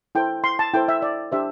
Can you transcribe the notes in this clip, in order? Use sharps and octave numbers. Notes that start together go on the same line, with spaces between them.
E4 A4 C5 G5
C6
A5
E4 A4 C5 G5
E5
D5
D4 G4 C5 E5